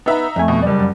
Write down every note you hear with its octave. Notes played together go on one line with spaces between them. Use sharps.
B3 D#4 B4 E5 A#5
F2 A3 G#5
B2
F#1 G3 D5
F#2